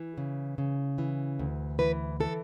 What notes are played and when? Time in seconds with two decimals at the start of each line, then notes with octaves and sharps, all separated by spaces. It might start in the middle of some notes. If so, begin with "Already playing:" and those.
Already playing: E3
0.18 C#3
0.58 C#3
0.98 E3
1.39 D2
1.79 E3 B4
2.20 E3 A4